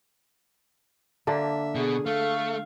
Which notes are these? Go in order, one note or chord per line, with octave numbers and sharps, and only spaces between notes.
D3 A#3 D4 E5
B2 G#4
A3 A4 F5